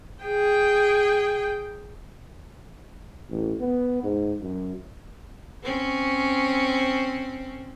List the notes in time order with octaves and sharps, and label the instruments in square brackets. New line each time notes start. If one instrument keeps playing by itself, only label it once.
[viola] G#4 G5
[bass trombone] A1
B3
G#2
F#2
[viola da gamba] C4 C#4